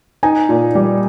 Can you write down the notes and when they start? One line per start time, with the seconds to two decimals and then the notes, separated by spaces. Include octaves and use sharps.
0.23 D#4 G#5
0.49 A#2
0.75 G3